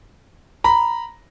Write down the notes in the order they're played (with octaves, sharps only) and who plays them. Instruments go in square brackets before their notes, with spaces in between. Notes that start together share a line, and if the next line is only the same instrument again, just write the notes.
[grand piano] A#5 B5